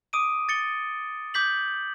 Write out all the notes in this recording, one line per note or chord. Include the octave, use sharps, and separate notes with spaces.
D6 D#6 D7 D#7
A6 C#7 G7
D6 G6 B6 F#7